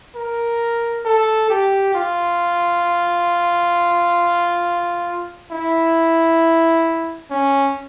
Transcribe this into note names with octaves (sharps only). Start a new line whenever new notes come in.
A#4
A4
G4
F4
E4
C#4